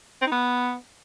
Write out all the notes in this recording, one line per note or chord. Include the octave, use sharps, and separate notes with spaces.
C4
D#4
B3